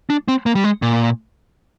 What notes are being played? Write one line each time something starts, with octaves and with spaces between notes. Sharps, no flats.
D4
C4
A#3
G3
G#3
A#2